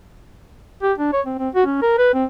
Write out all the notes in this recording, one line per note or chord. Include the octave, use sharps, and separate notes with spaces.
G4
D4
C#5
C4
C4
F#4
C#4
A#4
B4
C4